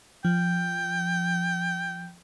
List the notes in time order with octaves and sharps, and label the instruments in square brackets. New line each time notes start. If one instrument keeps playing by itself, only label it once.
[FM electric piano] F3 [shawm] G5